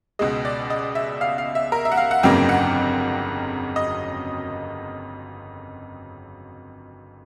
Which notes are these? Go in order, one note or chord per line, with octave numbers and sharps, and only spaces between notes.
C#2 B2 G#3 D#5
D5
D#5
E5
F5
F5
E5
A#4
E5
F#5
F5
F#5
G1 F2 C#3 F#3 A#3 G5
F#5
D#5